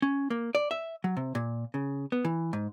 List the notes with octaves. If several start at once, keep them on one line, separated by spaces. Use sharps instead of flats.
C#4
A#3
D5
E5
F#3
C3
A#2
C#3
B3
E3
G#2